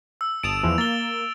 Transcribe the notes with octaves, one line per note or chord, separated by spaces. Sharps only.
E6
G1 A5 D#6 D7 E7 F7
E2 E3 F3
A#3 A6 G7